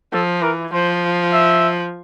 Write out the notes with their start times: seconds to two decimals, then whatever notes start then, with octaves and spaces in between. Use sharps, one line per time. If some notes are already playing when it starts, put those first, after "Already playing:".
0.13 F3 A4
0.42 E3 A#4
0.72 F3 C5
1.33 E5